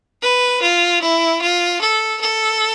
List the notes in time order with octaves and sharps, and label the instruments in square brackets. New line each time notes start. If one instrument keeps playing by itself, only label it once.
[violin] B4
F4
E4
F4
A4
A4